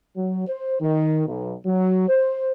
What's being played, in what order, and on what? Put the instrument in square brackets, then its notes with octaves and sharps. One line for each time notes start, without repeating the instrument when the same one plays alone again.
[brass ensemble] F#3
C5
D#3
B1
F#3
C5